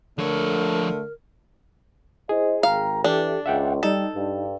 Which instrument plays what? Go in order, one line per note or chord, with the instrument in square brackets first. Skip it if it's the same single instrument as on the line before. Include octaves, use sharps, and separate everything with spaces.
[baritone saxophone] D3 [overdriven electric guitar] F3 C#5 [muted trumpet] A3 [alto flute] A#4
[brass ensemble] E4 C5 D#5 [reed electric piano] G#4
[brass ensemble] G#1 G5 A#5 [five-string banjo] F5
[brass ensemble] E3 [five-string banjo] D4 [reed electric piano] G4 A4
[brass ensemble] C#2 [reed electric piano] E5 F#5 G5
[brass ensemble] G3 [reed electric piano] D#4 [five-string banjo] A4
[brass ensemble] G2